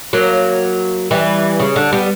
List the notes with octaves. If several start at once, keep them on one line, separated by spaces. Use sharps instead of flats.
F#3 A#3
E3 G3
C#3
D3
G3 B3